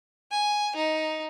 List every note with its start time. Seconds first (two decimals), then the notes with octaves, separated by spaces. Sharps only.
0.31 G#5
0.76 D#4